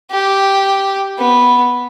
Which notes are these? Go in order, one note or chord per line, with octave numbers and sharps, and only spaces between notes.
G4
B3